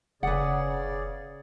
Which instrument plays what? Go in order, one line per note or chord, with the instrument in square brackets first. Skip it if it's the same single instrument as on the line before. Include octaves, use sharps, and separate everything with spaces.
[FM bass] F1 [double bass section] C#3 [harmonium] G#4 D5 [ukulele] B4 F#5